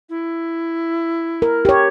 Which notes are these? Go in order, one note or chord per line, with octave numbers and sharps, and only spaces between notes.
E4
A#4
G4 C#5